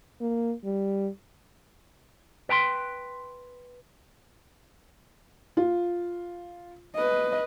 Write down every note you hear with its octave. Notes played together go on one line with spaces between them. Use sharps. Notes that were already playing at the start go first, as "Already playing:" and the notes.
A#3
G3
B4 G5 A#5 C6
F4
B4 D#5